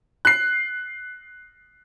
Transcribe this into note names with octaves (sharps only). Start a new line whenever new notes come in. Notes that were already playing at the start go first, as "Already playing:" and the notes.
F#6 C7